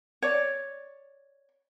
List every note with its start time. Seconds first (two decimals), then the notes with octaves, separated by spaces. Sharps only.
0.22 C#5 D5